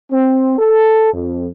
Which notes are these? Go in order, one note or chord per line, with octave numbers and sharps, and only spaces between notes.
C4
A4
F2